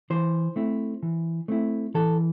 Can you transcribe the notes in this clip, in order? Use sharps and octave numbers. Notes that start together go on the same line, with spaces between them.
E3 C5
A3 C4 E4
E3
A3 C4 E4
E3 A4